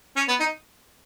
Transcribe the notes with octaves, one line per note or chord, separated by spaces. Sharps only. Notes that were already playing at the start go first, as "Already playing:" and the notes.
C#4
B3
D#4